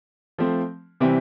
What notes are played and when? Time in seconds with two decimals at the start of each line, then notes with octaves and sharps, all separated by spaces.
0.38 F3 A3 C4
1.00 C3 E3 G3 C4